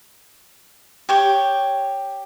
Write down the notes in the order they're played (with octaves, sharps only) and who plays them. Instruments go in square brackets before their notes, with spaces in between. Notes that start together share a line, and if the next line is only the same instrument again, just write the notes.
[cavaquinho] G4 C#5 G5